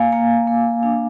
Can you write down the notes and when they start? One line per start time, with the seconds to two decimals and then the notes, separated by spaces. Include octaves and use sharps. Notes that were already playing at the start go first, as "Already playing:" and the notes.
Already playing: A#3 F5 G#5
0.12 A#3
0.47 A#3
0.83 D4